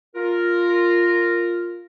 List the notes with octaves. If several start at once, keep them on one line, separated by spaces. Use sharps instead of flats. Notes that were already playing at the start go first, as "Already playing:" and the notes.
F4 A#4